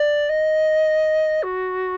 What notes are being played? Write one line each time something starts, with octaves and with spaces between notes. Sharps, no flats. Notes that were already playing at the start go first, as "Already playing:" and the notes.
Already playing: D5
D#5
F#4